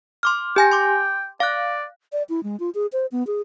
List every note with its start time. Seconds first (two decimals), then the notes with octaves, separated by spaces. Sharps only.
0.23 C6 D6 F6
0.56 G4 G5 G#5 A#6
0.72 C6 D6
1.40 D5 F5 F#6
2.12 D5
2.29 E4
2.43 G#3
2.60 F4
2.75 G#4
2.93 C5
3.12 B3
3.27 G#4